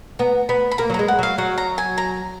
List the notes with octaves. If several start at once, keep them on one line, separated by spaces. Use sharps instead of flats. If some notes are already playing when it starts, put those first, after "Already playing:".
B3 A#5
B3 B5
B5
A#3 A#5
F#3
A#5
G#3
F#5
F#3 F5
F#3 F#5
A#5
G#5
A#5